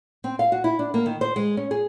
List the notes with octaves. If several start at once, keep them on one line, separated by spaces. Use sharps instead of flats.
C4
F5
F#4
E4
D4
A#3
D#3
C5
G#3
C#4
G#4